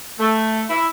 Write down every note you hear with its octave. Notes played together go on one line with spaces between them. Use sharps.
A3
E4